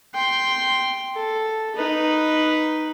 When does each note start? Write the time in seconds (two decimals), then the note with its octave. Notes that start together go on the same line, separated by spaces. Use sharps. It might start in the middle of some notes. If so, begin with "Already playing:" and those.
0.14 G5 C6
1.15 A4
1.76 D#4 B4